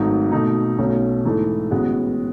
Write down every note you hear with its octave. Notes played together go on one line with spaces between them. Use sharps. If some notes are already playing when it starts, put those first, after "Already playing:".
Already playing: G#1 G#2 F#3 A3 D#4
B2 A3 D#4
B1 B2 A3 C#4
G#2 E3 A3 D#4 A4
A1 A2 G#3 B3 F#4